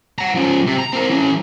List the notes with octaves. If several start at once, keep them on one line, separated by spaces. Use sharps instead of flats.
F#5 A#5
F3 C#4
C3
A#5
C4 A#4
E3 C#4